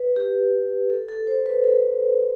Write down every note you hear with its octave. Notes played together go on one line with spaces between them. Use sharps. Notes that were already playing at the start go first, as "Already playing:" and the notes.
Already playing: B4
G4
A4
A4
C5
B4
A4